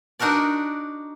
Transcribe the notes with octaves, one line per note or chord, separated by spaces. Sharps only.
D4 D#4 F#4 A#4 D5